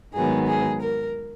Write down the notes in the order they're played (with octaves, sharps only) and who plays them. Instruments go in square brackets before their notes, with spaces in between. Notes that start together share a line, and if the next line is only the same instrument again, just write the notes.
[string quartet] G#2 D#3 F#3 B3 G#4
G#4
A#4